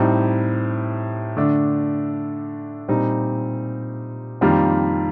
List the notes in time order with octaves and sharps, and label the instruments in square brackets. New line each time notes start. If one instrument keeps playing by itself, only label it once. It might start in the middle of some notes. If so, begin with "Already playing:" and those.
Already playing: [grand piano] A2 G3 C4 D#4
D3 A3 D4
A#2 G3 C4 D#4
F2 D#3 G3 A#3 F4